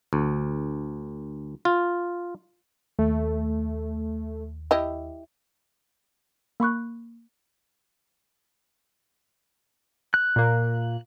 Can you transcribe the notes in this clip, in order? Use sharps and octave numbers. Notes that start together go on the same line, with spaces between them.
D2
F4
D#2 A3
E4 G4 D#5
A#3 B5 C#6 F#6
F#6
A#2 A#3